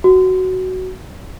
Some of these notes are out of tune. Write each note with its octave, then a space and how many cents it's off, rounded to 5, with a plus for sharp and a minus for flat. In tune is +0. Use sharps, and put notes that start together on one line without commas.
F#4 +10